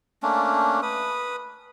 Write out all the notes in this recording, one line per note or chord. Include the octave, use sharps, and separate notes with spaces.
A3 A#3 C#4 D4
B4 D#6